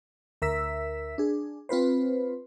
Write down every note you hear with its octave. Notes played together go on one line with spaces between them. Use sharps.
D2 A#4 E5 E6 B6
D4 G#4
C4 F4 B4 C5